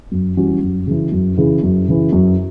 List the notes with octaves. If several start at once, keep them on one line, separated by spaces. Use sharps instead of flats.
F#2
E3 G3 C#4 F#4
F#2
C#3 E3
F#2
C#3 E3
F#2
C#3 E3
F#2